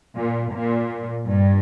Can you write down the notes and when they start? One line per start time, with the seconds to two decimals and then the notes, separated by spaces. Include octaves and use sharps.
0.16 A#2
0.53 A#2
1.28 G2